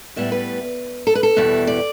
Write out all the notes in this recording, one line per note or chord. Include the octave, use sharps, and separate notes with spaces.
A2 G3 B3 E5
B4
A4
B4
A4
E2 B2 G3 E4
D5